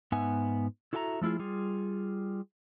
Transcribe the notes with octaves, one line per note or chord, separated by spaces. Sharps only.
G#2 B3 D#4 E5 F#5 G#5
E4 F#4 A4 E5 G5 A#5
F3 A3 E4 F4 G#4
G3 F4 G#4